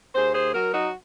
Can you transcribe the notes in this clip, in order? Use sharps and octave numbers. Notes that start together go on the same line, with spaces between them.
D#2 G#4 C5
G#4 C5
F#3 F#4 A#4
D#4 F#4